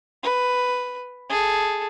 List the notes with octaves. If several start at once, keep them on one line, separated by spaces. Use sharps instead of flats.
B4
G#4 A4